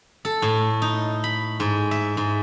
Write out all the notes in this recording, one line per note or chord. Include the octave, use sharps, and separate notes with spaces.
A4
A2
D#4
B5
G#2
E5
G#2